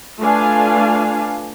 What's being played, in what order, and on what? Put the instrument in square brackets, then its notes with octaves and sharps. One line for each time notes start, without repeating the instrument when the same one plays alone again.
[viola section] A3 D4 F4 B4 F5 G#5